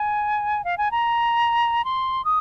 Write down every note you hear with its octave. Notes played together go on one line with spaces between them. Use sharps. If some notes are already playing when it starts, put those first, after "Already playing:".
Already playing: G#5
F5
G#5
A#5
C6
D#6